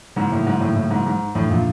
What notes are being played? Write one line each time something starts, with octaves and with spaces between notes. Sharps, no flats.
G#2 C#3 F#3 A#3 C#4 E4
A2
G#2
A2
A2
G#2
G#2
F2 A2 D3 F3
A#2